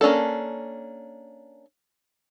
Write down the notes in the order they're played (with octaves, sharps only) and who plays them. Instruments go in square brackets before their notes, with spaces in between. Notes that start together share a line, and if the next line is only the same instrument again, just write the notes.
[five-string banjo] A#3 C#4 D4 A4